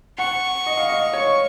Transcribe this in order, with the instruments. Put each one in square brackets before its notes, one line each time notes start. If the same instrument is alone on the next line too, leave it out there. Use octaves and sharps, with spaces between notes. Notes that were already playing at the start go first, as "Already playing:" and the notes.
[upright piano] F#5 [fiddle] C#6
[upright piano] D#5
F5
D#5
C#5